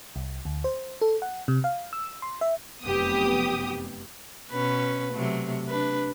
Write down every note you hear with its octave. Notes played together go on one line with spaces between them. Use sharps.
C2
D2
C5
A4
F#5
C3
F5
E6
C6
E5
F1 F#2 B3 G4 D#6
B2 C#4 B4
C3 F#3 A3
D4 B4